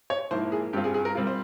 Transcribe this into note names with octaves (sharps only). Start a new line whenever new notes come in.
C#5
G#2 F3 A#3 E4 C5
G#4
G2 G3 C4 F4 G4
G#4
G#4
A#4
G3 C4 F4
C5